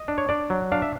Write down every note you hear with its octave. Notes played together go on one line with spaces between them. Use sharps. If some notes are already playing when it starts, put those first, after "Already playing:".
Already playing: D#5
D4
C#5
D4 D5
F#3
D4 F5
E5